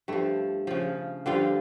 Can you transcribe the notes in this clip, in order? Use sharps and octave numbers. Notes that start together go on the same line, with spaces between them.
G2 F3 A3
C#3 F3
G2 D3 F3 F4